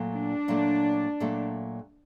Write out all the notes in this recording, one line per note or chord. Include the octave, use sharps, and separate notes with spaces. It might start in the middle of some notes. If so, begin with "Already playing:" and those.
Already playing: A#2 F#3 A3
D4
A#2 F#3 A3
A#2 F#3 A3